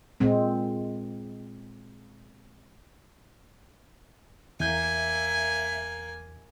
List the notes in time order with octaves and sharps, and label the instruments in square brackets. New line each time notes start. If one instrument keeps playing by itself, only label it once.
[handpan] A#2 G#3 C4
[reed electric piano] E2 G6 [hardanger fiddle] A#3 G#5 [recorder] E5